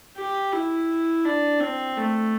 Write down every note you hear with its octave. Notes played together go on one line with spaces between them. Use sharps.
G4
E4
D4
C4
A3